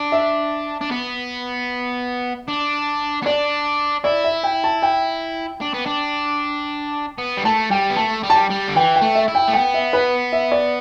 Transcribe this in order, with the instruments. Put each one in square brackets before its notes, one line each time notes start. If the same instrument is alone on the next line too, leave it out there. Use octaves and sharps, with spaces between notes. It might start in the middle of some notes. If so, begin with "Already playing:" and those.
Already playing: [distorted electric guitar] D4
[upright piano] E5
[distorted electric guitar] D4
B3
D4
B3
[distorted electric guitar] D4 [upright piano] D5
[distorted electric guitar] E4 [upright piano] D5
[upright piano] E5
G5
A5
G5
[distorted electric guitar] D4
B3
D4
B3
G3
[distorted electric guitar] A3 [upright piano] A5
[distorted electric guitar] G3 [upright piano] G5
[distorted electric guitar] B3
[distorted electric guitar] A3 [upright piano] A5
[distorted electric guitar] G3
[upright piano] A5
G5
[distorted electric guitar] G3
D3
[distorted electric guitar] E3 [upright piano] G5
[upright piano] G5
[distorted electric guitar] A3
[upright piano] E5
[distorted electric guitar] E4
[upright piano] G5
[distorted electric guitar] A3
[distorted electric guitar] B3 [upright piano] G5
[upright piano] E5
B4
E5
D5